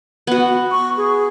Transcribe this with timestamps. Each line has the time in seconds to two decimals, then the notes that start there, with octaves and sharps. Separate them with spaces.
0.27 B3 F#4
0.71 C#6
0.97 G#4